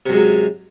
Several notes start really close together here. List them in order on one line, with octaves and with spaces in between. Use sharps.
C3 F#2 G#3 F#3